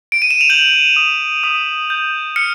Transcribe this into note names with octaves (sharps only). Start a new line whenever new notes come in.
D7
D#7
E7
F7
G6 F#7
D#6
D#6
G6
F6 C#7